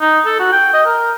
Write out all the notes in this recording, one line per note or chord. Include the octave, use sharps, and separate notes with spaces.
D#4
A4
F#4
G5
D#5
A#4